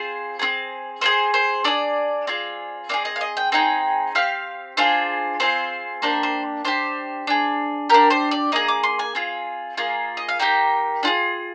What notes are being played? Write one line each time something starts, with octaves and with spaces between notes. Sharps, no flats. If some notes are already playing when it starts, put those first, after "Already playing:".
Already playing: C4 F4 G#4 C5
C4 F4 G#4
C4 F4 G#4 C5
C5
D4 G#4 D5
C4 F4 G#4
C4 F4 G#4 D5
D#5
F5
D#5
G5
C4 D#4 G#4 G5
C4 G4 F5
D4 F4 G#4 C5
C4 F4 G#4 C5
A#3 D4 G4 C5
C5
D4 G4 C5
D4 G#4
D4 G4 A#4
C5
D5
A#3 D#4 G#4 D#5
D6
C6
G#5
C4 F4 G#4
A#3 F4 G#4 F5
D#5
F5
A#3 D#4 G4 G5
D4 F4 G#4